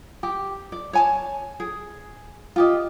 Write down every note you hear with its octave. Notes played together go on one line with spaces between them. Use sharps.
G4
D5
C#5 G#5 A5
G#4
F4 G4 D#5